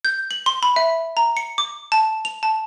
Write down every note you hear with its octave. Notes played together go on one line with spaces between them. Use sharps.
G6
F#7
C6
B5
E5
A#5
C#7
D6
A5
F7
A5